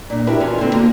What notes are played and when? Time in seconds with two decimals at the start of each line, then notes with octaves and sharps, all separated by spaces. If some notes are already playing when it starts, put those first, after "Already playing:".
0.10 A#2 D4
0.27 D4 E4 F#4 G4 A#4 B4
0.40 E3 C#4 F4 F#4 D5
0.58 D3 B3 C4
0.72 A#3 F#4